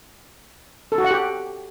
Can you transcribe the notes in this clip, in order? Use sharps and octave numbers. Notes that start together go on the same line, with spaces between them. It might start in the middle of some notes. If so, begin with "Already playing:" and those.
A4
F#4
F#5
G4